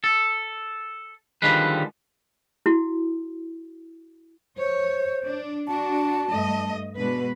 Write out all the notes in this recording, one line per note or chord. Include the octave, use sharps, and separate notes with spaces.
A4
D3 D#3 F3 G3 G#3 B4
E4 F#4
C5 C#5
D4
D4 F#4 A5
G2 A3 D#5
B2 G#3 D4 B4